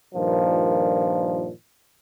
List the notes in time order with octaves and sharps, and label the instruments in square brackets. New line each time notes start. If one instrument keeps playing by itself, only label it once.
[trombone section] G2 A#2 D#3 F3